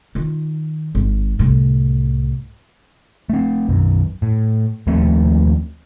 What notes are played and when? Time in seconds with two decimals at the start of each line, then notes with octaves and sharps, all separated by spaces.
0.15 D#3 F4
0.95 G#1
1.39 C2 A2
3.30 A3 C4
3.69 B1 F#2
4.22 A2
4.87 D#2 F3 A3 C4